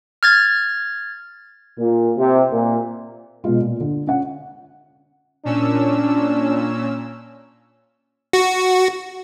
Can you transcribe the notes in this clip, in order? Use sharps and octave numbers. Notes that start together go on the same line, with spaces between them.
F6 G#6 A6
A#2
C3
A#2
B2 G#3 F4
A#2
D3
C#4 F#5
A#2 C#4 D4 E6
F#4